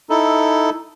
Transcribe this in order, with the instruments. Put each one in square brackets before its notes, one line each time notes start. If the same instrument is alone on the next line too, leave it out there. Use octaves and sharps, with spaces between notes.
[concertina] D#4 E4 A4